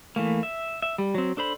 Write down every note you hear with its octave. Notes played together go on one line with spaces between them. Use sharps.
E3 A3 A#3
E5
E5
G3
F#3 C4
D4 A4 C5 B5